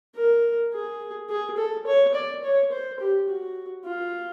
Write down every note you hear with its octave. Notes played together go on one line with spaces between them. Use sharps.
A#4
G#4
G#4
A4
C#5
D5
C#5
C5
G4
F#4
F4